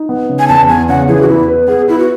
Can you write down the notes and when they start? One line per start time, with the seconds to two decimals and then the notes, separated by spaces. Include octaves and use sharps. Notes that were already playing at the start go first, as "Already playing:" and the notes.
Already playing: D#4
0.09 B3
0.29 C#3
0.39 G#5
0.48 E2 A5
0.68 E2 G#5
0.89 C#3 F#5
1.08 E3 G#4
1.22 F#4
1.29 E2 E4
1.48 B4
1.68 B3 G#4
1.88 E4 B4
1.99 F#4